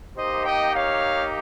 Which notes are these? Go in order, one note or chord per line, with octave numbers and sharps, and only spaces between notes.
A#3 D#4 G4 C5 D#5
D#5 G5
C#5 F5